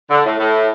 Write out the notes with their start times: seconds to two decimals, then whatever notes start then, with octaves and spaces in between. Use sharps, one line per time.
0.10 D3
0.24 A2
0.38 A2